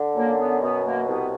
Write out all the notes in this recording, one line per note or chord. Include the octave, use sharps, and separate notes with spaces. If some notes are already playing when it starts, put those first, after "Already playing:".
Already playing: D3
F#2 A#3
B3
B2 B3
A#3
C2 B3